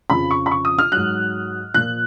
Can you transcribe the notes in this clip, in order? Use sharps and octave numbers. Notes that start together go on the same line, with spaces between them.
F2 C#3 F3 B5
C#6
B5
C#6
D#6
F6
G#2 F#3 F#6
A#2 F3 F#6